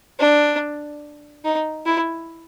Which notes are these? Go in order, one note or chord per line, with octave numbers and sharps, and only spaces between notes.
D4
D#4
E4